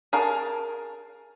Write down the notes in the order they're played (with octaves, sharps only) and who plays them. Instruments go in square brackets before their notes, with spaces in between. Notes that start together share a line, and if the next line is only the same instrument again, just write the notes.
[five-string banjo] G#4 A#4 A5